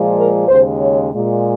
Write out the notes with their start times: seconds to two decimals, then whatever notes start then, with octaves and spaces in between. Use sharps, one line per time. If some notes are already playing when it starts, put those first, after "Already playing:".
Already playing: A#2 F3 G#3
0.16 A#4
0.48 D#2 C#3 G#3 C5
0.80 C#5
1.12 A#2 G#3